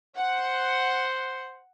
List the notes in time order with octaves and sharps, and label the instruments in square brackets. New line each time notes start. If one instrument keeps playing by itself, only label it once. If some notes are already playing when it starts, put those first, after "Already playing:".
[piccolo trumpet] C5 [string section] F#5